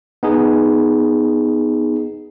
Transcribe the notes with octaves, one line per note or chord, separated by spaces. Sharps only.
B3 D#4 G#4